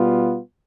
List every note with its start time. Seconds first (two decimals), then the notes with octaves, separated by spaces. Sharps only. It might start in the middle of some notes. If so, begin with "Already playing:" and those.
Already playing: B2 G3 B3 F4